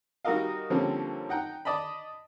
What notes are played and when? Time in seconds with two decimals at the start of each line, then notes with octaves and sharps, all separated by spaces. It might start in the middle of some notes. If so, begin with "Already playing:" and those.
0.25 G3 D#4 F#4 A#4 D#5 F5
0.70 D3 F3 G3 A#3 C4 C#4
1.29 D#4 F#5 G5 A#5
1.65 D5 D#5 A5 B5